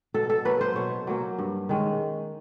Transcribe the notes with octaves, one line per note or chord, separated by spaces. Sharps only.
B2 A4
A4
F#3 A#3 C#4 B4
C5
B2 C#5
F#3 A#3 C#4
G2
D#3 G#3 C#4